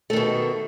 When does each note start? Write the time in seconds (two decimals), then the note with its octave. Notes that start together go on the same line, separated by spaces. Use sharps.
0.10 A3
0.13 D#3
0.16 B2